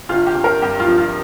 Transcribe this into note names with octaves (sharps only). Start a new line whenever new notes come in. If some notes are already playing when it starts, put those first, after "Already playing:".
G1 F4
G4
G1
A#4
G2 G4
F4
F3
F4